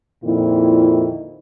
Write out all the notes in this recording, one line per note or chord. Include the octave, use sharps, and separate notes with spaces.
F2 A#2 D#3 E4